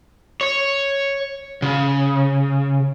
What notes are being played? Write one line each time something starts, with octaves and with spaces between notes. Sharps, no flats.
C#5
C#3